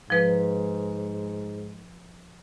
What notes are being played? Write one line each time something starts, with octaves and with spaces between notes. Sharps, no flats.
G#2 F3 B4